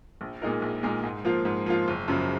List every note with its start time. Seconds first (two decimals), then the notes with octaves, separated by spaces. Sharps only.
0.21 A#1
0.42 A#2 G#3 D#4 A#4
0.62 A#1
0.83 A#2 G#3 D#4 A#4
1.04 G#2
1.25 F3 A#3 F4
1.45 G#2
1.66 F3 A#3 F4
1.88 F#1
2.08 F#2 C#3 F3